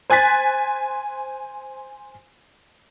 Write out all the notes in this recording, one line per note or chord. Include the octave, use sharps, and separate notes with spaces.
C5 G#5 F#6 A6 B6